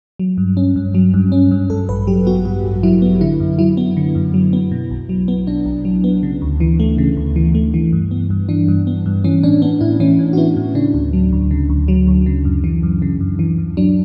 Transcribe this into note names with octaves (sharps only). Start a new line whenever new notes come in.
F#3
G2
C#4
G2
F#3
G2
C#4
G2
G2 A4
A1 B4
F#3 G4
B3 F#4
G2 F#4
A1
F#3 E4
B3
D3 E4
F#2
F#3 E4
B3
D3
F#2
F#3
B3
B2
B1
F#3
B3
B2 D4
B1
F#3
B3
C#3
D2
E3
A3
C#3
D2
E3
A3
E3
G2
B3
G2
E3 D4
G2
B3
G2
E3 C#4
A2 D4
B3 D4
A2 E4
E3 C#4
A2
F#4
B3 E4
A2
C#3 D4
D2
F#3
D2
C#3
D2
F#3
D2
C#3
F#2
E3
F#2
C#3
F#2
E3
F#2
F#3 D4